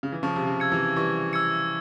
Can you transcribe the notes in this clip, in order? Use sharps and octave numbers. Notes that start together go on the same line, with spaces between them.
C#3
E3
C#3 F3 C#6
C3
C#3
E6 G#6 C#7
C3 E3
E3 G3 C#6
E6 G#6 C#7